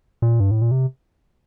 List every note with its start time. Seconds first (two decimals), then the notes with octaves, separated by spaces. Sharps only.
0.22 A#2
0.40 G2
0.51 A2
0.62 A#2
0.71 C3